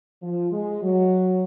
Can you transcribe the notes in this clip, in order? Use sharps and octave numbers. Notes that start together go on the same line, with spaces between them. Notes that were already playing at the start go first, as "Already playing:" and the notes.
F3
G#3
F#3